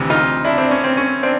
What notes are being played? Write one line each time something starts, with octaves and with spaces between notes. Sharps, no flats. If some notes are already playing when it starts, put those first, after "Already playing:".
Already playing: D2 C3 E3
D#4 F4
D4 E4
C4 D4
C#4
C4
C#4
C4 D4